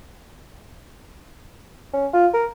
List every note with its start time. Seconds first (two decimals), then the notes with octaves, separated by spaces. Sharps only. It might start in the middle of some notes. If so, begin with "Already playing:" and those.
1.93 C#4
2.13 F4
2.34 A#4